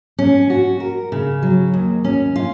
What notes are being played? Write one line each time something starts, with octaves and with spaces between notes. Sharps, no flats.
C#4
F#4
A#4
C#3
F#3
D#2
C#4
F4